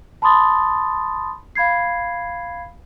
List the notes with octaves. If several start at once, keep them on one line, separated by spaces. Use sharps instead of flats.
A5 B5 C6 D#6 A6
F5 B5 G#6 C7